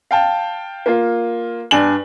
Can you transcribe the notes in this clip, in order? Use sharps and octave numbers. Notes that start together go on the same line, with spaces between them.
F5 G5 A5
A#3 F4
G2 D4 G#5 F#7